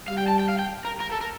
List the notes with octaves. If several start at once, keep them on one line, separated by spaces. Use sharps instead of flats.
G3 F5
G5
A5
G5
F5
G5
A#4
A#4
A4
A#4